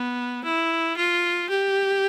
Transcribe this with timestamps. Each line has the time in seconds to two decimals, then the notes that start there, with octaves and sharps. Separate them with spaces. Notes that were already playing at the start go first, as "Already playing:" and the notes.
Already playing: B3
0.44 E4
0.97 F4
1.50 G4